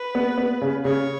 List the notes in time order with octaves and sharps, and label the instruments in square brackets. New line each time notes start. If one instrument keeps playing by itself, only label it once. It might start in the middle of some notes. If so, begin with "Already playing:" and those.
Already playing: [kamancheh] B4
[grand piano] B3
B3
C#3
[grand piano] C#3 [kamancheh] C#5